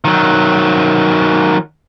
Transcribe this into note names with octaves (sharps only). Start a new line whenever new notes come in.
D#3 F#3